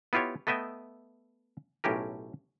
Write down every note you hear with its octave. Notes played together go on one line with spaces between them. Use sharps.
B3 E4 F4 G4 C#5
A3 B3 D#5 E5 G5
B1 A2 C#4 G4 A#4